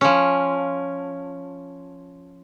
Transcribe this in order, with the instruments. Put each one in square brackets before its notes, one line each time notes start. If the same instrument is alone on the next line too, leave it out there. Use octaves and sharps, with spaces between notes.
[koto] F3 C#4